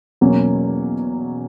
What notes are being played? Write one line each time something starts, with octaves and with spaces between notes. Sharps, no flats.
E2 B2 F#3 A#3 C#4